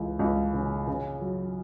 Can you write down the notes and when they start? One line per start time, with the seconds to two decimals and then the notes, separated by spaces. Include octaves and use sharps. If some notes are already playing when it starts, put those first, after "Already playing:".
Already playing: C#2 E3
0.19 C#2
0.54 C#3
0.87 C#3
1.21 F#3